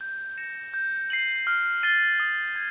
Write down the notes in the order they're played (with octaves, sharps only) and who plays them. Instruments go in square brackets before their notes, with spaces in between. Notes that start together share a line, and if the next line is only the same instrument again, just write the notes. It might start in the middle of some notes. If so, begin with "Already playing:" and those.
[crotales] G6
A#6 C#7 E7
G6
C7 D#7 F#7
F6
A6 C7 D#7 G7
D#6
G#6